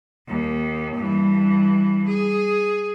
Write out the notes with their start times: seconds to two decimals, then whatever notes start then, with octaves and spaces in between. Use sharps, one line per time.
0.28 D#2
0.96 G2 E3
2.07 G#4